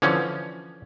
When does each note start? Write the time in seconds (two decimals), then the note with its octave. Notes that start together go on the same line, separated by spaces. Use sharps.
0.02 D3 E3 F3 C#4